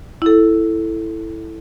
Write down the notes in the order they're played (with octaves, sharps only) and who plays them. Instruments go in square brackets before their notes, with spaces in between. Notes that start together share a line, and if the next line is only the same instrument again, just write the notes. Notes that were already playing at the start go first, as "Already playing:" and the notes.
[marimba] E4 A4